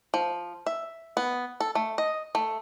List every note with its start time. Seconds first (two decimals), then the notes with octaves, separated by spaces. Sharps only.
0.14 F3
0.66 E5
1.17 B3
1.60 A4
1.75 A3
1.98 D#5
2.35 A3